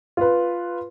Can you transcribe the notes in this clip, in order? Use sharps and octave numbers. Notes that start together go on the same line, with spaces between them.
F4 B4